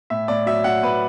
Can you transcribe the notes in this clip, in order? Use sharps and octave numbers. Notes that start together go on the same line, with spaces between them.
A2 E5
A2 D5
F#3 E5
F#3 F#5
A2 B4